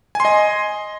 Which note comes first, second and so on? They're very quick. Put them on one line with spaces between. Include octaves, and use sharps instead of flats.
G#5 C6 D#5